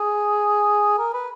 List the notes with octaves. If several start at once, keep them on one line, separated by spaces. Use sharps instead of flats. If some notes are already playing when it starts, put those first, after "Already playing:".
Already playing: G#4
A#4
B4